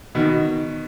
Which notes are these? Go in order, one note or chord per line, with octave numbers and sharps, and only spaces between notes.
B2 D#3